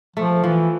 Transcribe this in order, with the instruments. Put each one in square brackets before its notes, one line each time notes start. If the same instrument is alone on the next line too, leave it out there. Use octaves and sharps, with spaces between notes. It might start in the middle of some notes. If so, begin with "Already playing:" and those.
[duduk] F3 [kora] A3
[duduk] E3 [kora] F3